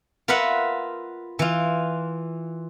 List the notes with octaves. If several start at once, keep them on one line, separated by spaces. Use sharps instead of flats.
F4 A#4 B4 E5 F#5
E3 F4